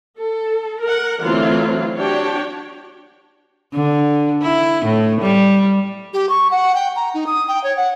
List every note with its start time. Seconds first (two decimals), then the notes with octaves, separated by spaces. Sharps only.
0.18 A4
0.81 A#4 F#5
1.20 D3 E3 F#3 A3 C4 F4
1.98 D4 F#4 G4 C#5 G5
3.73 D3
4.42 E4
4.85 A2
5.21 G3
6.14 G4
6.29 C#6
6.51 F#5
6.75 G5
6.96 A#5
7.14 D#4
7.27 D#6
7.48 G5
7.64 C#5
7.77 F#5